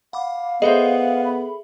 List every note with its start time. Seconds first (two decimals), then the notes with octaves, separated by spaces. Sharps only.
0.13 F5 F#5 B5 D6
0.62 B3 G#4 A4 C5 D#5 E5
1.25 B5